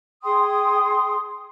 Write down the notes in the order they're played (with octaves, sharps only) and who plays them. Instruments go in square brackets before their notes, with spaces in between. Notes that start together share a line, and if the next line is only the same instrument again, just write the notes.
[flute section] G#4 G5 C6 D#6